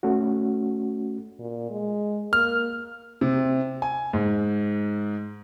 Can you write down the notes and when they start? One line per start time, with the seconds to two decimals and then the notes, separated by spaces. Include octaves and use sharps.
0.03 A3 C#4 F#4
1.39 A#2
1.70 G#3
2.33 A#3 F6
3.21 C3
3.82 G#5
4.13 G#2